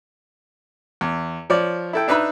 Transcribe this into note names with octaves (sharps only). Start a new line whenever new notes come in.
E2
F3 C#5 D5
E4 A4 G5
D4 D#4 B4 E5 B5